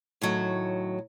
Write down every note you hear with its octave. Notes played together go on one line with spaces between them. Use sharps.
A2 D#3 F#3